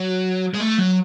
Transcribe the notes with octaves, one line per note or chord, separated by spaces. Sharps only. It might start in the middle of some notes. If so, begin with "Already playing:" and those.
Already playing: F#3
G#3
A3
F#3